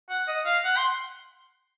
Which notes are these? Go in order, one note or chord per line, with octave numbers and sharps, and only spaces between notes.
F#5
D#5
F5
F#5
C6